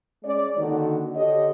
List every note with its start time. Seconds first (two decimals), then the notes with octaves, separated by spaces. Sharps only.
0.23 G#3 C#4 C#5 D5
0.58 D3 D#3 A#3 F#4
1.15 D3 G4 C#5 D#5